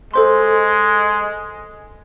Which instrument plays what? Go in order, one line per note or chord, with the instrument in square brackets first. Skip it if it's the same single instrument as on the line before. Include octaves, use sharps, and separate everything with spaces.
[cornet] G#3 [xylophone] A4 C5 C6